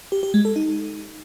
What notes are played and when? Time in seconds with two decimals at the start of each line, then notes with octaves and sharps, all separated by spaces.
0.12 G4
0.23 G4
0.34 G#3
0.45 A4
0.56 D#4